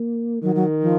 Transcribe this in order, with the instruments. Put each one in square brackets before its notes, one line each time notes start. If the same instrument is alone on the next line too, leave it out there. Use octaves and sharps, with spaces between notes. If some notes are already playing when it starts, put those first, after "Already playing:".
Already playing: [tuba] A#3
[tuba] D#3 [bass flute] F#3
[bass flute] F#3
F3